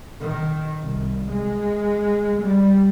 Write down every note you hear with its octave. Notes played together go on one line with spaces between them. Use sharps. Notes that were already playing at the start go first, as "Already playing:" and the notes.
D#3
C2
G#3
G3